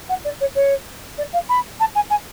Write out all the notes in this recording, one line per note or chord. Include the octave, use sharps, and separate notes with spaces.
F#5
D5
C#5
C#5
D5
F5
B5
A5
G#5
G#5